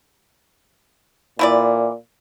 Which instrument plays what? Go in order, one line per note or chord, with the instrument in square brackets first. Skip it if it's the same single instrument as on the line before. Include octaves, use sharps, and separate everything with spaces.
[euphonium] A#2 [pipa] E3 E4 D5